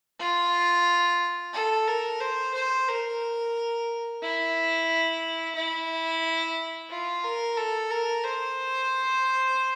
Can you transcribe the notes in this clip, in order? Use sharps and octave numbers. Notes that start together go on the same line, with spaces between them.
F4
A4
A#4
C5
C5
A#4
E4
E4
F4
A#4
A4
A#4
C5